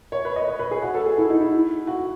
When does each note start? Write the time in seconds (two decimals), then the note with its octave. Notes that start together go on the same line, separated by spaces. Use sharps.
0.12 C#5
0.25 B4
0.36 D#5
0.48 C#5
0.59 B4
0.71 G#4
0.82 F#4
0.94 A4
1.06 G#4
1.18 E4
1.30 D#4
1.41 E4
1.87 F#4